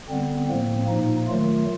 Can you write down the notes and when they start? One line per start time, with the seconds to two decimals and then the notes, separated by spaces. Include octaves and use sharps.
0.09 D3 G3 B3 C4
0.48 A2 F3 A#3 C4
0.89 A#2 F3 A#3 D#4
1.27 D#3 F#3 A3 F4